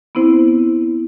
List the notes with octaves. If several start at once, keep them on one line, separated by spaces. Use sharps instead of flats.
B3 C4 E4 C5